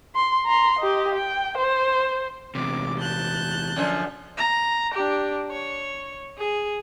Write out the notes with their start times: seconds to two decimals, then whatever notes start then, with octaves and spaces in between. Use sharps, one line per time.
0.15 C6
0.46 A#5 C6
0.79 G4 D#5
1.15 G5
1.58 C5
2.55 E2 C3 D6
3.00 A5 F#6 G6
3.76 F#2 D3 F3
4.38 A#5
4.94 D4 G4
5.51 C#5
6.38 G#4